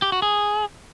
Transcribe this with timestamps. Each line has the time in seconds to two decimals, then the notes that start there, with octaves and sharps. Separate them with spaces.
0.02 G4
0.12 F#4
0.22 G#4